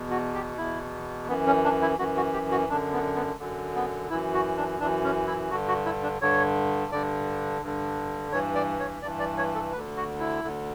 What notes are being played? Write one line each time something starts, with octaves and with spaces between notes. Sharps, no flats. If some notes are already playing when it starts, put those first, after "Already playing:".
Already playing: E2 B2
F#4
G4
E2 B2 E4
F#2 E3 B3
C#4
D4
E4
F#2 E3 F#4
F#4
G4
F#4
F#2 D3 D4
B3
B3
F#2 D3
B3
F#2 E3 E4
F#4
D4
F#2 E3 D4
C#4
E4
G2 D3 F#4
F#4
E4
D4
G2 D3 C#5
G2 D3 D5
G2 D3
G2 E3 C#5
D5
C#5
G2 E3 D5
D5
C#5
A4
D2 D3 B4
F#4
E4
D2 D3